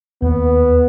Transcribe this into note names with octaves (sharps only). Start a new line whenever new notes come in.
D#2 B3